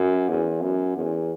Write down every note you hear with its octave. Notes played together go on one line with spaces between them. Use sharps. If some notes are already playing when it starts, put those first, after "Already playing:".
Already playing: F#2
E2
F#2
E2